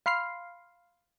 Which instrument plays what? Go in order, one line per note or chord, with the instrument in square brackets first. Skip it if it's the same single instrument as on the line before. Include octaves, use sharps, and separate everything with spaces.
[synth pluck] F5 B5 C6 F6 C7